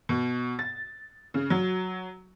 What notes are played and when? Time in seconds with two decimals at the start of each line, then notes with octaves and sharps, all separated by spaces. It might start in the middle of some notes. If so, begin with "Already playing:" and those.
0.09 B2
0.59 A6
1.34 C#3
1.50 F#3